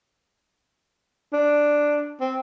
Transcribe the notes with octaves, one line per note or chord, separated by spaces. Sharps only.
D4
C4